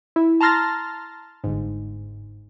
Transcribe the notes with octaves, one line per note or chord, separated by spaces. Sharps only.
E4
A5 A#5 C6 F6 A6 A#6
G1 G#2